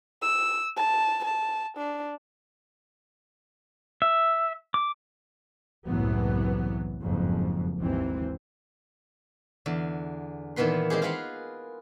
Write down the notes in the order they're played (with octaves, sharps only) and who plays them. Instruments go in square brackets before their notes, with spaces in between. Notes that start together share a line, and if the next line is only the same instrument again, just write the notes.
[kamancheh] E6
A5
A5
D4
[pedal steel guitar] E5
D6
[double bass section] F#1 C2 A2 E3 F#3 B3
F#1 F2 G#2
G#1 D#2 E3 C4
[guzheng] E2 D3
A#2 D#3 E3 B3 B4 C6
G#3 C4 G4 G#4
F4 G#4 A#4 B4 F5 F#5